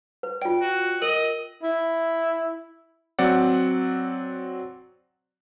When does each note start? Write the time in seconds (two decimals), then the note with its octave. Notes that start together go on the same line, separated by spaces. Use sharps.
0.23 B4
0.42 F4 D5 G5
0.61 F#4
1.02 A#4 D#5 F#7
1.63 E4
3.19 F#3 C4 D5 F#5